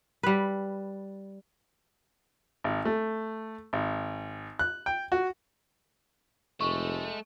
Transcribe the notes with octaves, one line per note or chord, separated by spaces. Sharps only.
G3 B4
G#1
A3
G#1
F#6
G5
F#4
F1 G#3 A3 C#6